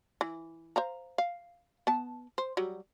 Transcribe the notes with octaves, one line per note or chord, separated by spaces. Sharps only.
E3
C5 F5 A#5
F5
B3 A5
C5
F#3 G3